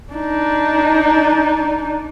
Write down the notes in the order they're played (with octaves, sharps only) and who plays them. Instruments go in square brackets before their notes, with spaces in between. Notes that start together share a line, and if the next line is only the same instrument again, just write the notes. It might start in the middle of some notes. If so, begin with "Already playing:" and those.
[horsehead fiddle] D4 D#4